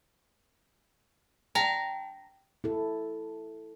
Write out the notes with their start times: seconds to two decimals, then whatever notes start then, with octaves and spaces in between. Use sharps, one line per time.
1.55 G5 A5 A#5
2.64 E4 A4